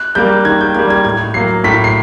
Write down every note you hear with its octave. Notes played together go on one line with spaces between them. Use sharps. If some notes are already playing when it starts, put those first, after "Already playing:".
Already playing: F#6
G3 A#3 G6
D#3 G#6
G6
G3 A#3 G#6
G#6
A2 G#6
F#3 A#3 C7
A2 B6
C7